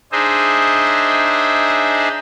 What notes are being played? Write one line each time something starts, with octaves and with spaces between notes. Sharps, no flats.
D4 D#4 G#4 C5 D#5 E5